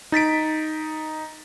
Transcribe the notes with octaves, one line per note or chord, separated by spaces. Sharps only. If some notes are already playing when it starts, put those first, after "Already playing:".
D#4 A6 B6 D7